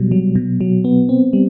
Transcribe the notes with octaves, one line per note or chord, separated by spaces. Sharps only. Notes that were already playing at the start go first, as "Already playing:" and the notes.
Already playing: B2 F#3 G3
F#3
B2
F#3
B3
C4
G3